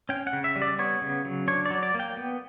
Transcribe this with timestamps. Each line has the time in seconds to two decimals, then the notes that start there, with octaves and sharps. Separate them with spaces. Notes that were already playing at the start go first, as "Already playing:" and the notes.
0.09 C#4 G5
0.27 F#5
0.33 C#3
0.44 E5
0.56 G3
0.62 D5
0.79 B3 C#5
1.02 C#3
1.25 F#3
1.48 D4 C#5
1.66 F#3 D5
1.83 D5
1.94 A#3
2.00 G5
2.17 B3